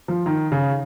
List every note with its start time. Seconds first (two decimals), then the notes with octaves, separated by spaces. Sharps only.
0.08 F3
0.26 D#3
0.52 C#3